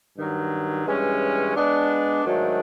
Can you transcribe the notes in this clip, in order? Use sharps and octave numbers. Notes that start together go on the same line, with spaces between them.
G2 D#3 F#3
G2 E3 G#3 C#4
G#3 B3 D4
G#2 D#3 F#3 A3 D4